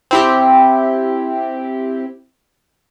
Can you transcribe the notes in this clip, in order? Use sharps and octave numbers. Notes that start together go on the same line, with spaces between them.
C4 E4 G4